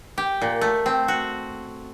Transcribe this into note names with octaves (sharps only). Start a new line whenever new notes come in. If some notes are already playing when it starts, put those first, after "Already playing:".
G4
A#2
A3
C4
F#4